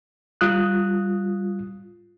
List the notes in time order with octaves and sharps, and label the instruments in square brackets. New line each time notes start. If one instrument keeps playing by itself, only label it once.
[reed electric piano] G3 F4 D#6 F#6